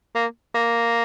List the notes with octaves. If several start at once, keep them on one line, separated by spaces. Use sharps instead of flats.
A#3
A#3